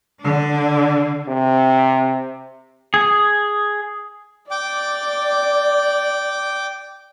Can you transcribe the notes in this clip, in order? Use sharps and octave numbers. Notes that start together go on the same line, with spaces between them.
D3 D4
C3
G#4
D5 G5 D6